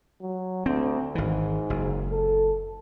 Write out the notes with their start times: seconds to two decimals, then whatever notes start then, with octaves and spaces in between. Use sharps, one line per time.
0.21 F#3
0.66 D2 C4
1.15 G#1 G#2 E3
1.70 F#1
2.11 A4